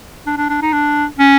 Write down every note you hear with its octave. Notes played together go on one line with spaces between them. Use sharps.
D4
D4
D4
D#4
D4
C#4